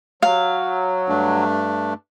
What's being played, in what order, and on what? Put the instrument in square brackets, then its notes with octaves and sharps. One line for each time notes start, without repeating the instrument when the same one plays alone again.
[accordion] F#3 [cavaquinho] F5
[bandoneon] G2 A3 D4